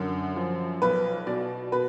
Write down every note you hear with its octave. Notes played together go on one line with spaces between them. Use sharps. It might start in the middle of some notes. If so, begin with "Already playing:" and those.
Already playing: F#2 D3 A#4
F3
B1 B4
B2 D5
B2 B4